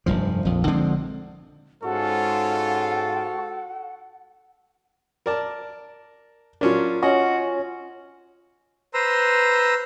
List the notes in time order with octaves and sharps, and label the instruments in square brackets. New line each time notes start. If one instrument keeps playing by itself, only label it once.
[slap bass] F1 E2 G2 F3
A#1 F2
D3 F3 G#3 C4
[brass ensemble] G#2 C#4 F4 [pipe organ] F#4 [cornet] A4 [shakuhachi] F#5
[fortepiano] A#4 D5 A5
[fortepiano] F#3 C#4 D4 [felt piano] F4 A#4
[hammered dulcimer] C#4 [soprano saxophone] F#4 [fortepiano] D#5
[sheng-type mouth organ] B4 C5 A#5 C6 E6